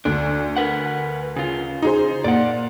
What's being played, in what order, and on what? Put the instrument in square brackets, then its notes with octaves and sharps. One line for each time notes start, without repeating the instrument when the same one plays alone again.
[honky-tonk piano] D2 [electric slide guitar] D4
[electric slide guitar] A#4 B4 F#5
C#3 F4
[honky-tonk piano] D#4 G#4 C5
[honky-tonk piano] A#2 [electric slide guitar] D5 F#5